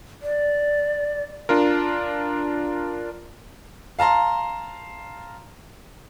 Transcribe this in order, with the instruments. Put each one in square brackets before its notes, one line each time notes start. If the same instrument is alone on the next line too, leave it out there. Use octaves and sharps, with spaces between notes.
[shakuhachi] D5
[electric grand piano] D4 F4 A#4
[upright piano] F5 A5 A#5 C6